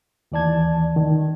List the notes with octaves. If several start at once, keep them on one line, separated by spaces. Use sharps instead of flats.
D#2 E3 D5 A5 G#6
D#3